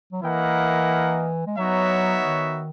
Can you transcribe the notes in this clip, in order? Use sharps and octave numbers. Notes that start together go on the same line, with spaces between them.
F#3
E3 A#3 E4 A#4 D#5 F#5
G#3
F#3 B3 D#4 F#4 C#5 E5
D#3